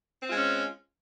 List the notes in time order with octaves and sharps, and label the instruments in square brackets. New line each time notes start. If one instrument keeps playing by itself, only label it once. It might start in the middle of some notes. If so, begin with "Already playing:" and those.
[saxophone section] C4
F4
G#3
C#4